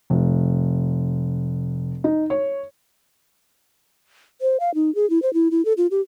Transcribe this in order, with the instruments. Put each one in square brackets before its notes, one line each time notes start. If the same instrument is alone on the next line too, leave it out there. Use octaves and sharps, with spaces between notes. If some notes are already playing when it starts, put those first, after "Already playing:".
[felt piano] F1
D#4
C#5
[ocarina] C5
F5
D#4
G#4
E4
C5
E4
E4
A4
F4
G4